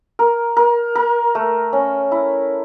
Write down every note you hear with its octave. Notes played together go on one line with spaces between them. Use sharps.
A#4
A#4
A#4
A3
C#4
E4